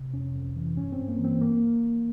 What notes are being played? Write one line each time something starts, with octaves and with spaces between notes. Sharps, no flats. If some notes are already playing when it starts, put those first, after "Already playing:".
Already playing: C3
F2 C#4
F2
E3
G2 C#4
C4
G2
A#3
E3
C4
A#3